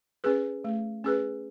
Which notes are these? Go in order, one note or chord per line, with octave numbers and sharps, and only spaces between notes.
C#4 G#4 B4
A3
C#4 G#4 B4